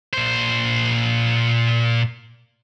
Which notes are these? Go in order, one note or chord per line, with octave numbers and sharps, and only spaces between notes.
A#2 C5